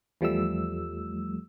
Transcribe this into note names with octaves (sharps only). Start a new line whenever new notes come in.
E2 F3 G3 A3 E6